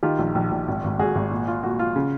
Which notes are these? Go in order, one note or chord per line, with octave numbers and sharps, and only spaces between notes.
D#3 F4 G4
A#1
A#1
A#1
G#1
G#1
G#1 F#4 G#4
G#1
A#2
F4
A#2 F#4
F4
C#3